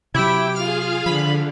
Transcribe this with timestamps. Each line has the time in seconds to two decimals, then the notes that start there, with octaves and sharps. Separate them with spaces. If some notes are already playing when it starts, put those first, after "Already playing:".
0.14 C3 F#3 E4 G4 G5 D6
0.56 F4 G#4 F5 F6
1.06 D3 F3 B5